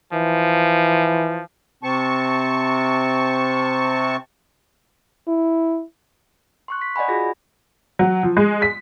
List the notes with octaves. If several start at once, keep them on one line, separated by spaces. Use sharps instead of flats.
E3 F3
C3 C4 A5 C#6
E4
C6 C#6 F#6
B6
D5 D#5 F#5 G#5 B5
F4 F#4 G#4 A#6
F#3
F3
G#3
B6